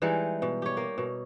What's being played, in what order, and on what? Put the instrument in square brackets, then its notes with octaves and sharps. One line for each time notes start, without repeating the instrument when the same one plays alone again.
[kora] E3 G3 G#3 D#4
B2
G4 C#5
A#3
B2